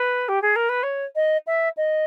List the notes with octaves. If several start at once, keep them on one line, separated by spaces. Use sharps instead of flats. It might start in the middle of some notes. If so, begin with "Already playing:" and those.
Already playing: B4
G4
G#4
A#4
B4
C#5
D#5
E5
D#5